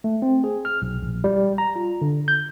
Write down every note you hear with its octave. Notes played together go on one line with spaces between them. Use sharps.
A3
C4
G#4
F6
B1
A#1
G3
A#5
F4
D3
G6